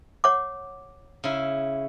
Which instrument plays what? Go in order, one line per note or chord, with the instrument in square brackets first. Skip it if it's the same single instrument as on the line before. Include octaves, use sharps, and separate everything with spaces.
[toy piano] C#5 F#5 D6
[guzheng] C#3 E4